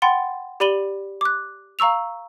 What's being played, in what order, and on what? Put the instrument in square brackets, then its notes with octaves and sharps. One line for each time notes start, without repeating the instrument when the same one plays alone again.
[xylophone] F#5 G5 B5 C6 A6
G4 D5 B5 D#7 F#7 G7
D6 F#6
F5 A#5 C#6 E6 F7